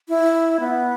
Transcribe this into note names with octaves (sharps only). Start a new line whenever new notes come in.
E4
B3